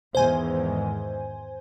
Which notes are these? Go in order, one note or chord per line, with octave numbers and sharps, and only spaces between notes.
E2 G#2 D#3 C5 G#5